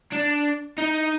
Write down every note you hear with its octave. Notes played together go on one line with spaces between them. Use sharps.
D4
D#4